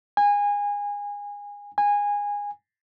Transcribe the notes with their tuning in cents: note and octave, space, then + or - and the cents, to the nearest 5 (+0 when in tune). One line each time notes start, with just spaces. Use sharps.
G#5 -25
G#5 -20